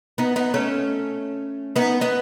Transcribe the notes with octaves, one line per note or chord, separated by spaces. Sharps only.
B3 D#4
B3 D#4
A3 C#4
B3 D#4
B3 D#4